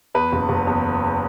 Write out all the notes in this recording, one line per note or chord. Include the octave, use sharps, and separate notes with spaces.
E2 B4
F#1
F#1
E2